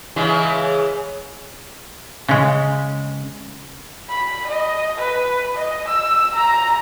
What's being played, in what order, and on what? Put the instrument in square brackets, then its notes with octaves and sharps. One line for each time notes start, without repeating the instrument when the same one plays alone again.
[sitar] C#3 E3 G#3
[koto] C#3 G#3
[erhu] B5
D#5
B4
D#5
E6
A#5